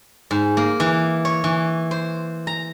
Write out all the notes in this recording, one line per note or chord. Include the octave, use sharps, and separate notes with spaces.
G#2
A#3
E3
C#5
E3
C5
A#5